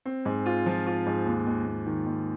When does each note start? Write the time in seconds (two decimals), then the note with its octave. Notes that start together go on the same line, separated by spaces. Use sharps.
0.05 C4
0.25 G#2
0.46 F4
0.66 F3
0.87 F4
1.06 G#2
1.25 D#2
1.46 D#2
1.66 D#2
1.86 D#3
2.06 D#2